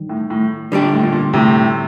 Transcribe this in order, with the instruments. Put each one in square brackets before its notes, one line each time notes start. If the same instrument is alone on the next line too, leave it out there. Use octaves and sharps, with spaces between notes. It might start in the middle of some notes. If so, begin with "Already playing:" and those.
Already playing: [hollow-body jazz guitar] G2 D#3
[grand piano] A2
A2
[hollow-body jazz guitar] D3 G3 D4 G4
[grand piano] A#2
A2
A#2
A#2
A2 C3